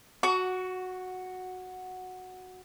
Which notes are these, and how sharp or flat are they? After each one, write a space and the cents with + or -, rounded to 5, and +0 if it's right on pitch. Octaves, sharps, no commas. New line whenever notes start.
F#4 -5 C#6 +25